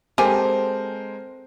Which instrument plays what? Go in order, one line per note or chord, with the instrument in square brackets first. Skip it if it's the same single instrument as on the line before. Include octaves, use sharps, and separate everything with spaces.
[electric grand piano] G#3 A#4 C5 [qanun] C4 A4 [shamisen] G4 G#5